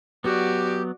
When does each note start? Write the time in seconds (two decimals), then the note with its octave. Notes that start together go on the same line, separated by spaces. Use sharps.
0.24 F#3 B3 F#4 G4 D5